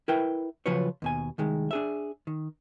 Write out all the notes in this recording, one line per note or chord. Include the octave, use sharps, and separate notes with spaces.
E4 A#4 B4 E5 G5
C#3 F3 F#3 F4 B4 C#5
D#2 B2 G#5
C2 D#3 G#3
D4 G#4 E5
D#3